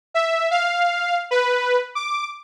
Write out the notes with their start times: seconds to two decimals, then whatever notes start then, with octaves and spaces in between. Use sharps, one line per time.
0.14 E5
0.51 F5
1.31 B4
1.95 D6